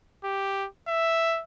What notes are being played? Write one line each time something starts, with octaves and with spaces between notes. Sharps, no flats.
G4
E5